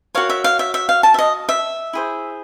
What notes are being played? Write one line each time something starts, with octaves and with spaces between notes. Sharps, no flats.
F#4 A#4 C#5 F5
E5
F5
E5
E5
F5
A5
E5
D#5
E5
E4 G#4 C5